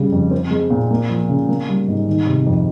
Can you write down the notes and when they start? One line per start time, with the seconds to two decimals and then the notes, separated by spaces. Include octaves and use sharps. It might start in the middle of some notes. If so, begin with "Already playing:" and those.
Already playing: C#3 G3
0.12 F2
0.31 C4
0.51 G#3
0.70 A#2
0.91 A#3
1.09 F3
1.29 C#3
1.49 A#3
1.68 G3
1.88 G#2
2.07 D#3
2.27 C3
2.46 F2